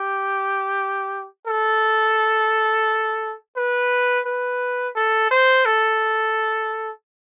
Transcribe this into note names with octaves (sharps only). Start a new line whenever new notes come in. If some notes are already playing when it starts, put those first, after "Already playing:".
Already playing: G4
A4
B4
B4
A4
C5
A4